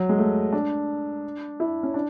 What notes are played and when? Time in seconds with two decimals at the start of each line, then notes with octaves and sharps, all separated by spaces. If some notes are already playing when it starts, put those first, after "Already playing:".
Already playing: F#3
0.09 G#3
0.18 A3
0.53 D4
1.60 E4
1.83 C#4
1.94 D4